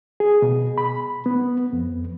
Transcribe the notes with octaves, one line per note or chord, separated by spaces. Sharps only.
G#4
B2
B5
B3
F2